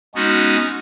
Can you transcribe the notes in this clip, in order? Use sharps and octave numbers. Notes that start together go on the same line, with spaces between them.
G#3 B3 C#4 D#4 F#4